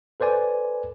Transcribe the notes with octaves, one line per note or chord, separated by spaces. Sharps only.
A4 B4 C5 D5 G#5